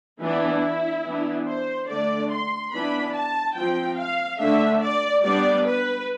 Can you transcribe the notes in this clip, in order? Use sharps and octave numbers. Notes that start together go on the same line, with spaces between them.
E3 B3 D4 E4
E3 B3 D4
C5
D3 A3 D4 D5
C6
E3 B3 D4 B5
A5
F3 C4 G5
F5
D3 A3 D4 E5
D5
G3 B3 D4 D5
B4